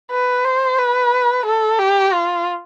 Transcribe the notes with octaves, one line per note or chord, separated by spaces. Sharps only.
B4
C5
B4
A4
G4
F4